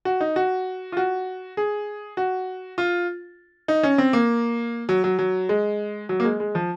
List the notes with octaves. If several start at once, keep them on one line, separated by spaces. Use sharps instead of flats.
F#4
D#4
F#4
F4
F#4
G#4
F#4
F4
D#4
C#4
C4
A#3
F#3
F#3
F#3
G#3
F#3
A#3
G#3
G#3
F3